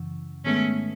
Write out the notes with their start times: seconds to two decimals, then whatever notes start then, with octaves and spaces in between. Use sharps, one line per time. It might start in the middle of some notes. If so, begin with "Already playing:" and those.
Already playing: F#2 C#3 E3
0.44 G#2 D#3 G#3 A3 B3 C#4